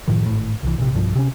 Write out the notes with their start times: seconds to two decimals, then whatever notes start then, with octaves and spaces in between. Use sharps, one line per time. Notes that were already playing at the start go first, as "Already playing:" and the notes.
0.08 F#1 A2 D#3 F3
0.26 G#1 A2
0.63 C2 E3
0.78 A#1 C3
0.95 B1 G2 F3
1.16 C3 C#4